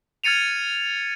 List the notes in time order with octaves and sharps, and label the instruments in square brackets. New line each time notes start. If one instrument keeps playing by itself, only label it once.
[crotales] F6 G#6 A6 C#7 D#7 F7